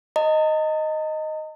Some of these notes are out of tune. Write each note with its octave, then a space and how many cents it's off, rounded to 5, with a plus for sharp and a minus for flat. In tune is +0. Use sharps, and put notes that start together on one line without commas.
D#5 +0 A#5 -45